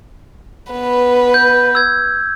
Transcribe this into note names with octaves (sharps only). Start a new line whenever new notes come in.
B3 B4
G6
E6 G#6